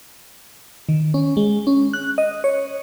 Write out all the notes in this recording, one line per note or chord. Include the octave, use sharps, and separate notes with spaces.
D#3
C#4
G#3
C#4
F#6
D#5
C#5